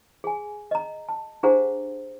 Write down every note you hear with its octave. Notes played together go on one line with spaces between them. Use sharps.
G#4 G#5
D#5 A#5
A5
D4 G4 G#4 C5 F#5 A#5